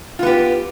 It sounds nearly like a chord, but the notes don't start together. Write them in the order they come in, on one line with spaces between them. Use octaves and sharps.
F4 B3 G4